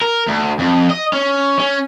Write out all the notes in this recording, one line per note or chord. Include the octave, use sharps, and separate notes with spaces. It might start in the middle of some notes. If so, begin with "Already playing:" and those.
A#4
D2
F2
D#5
C#4
C#4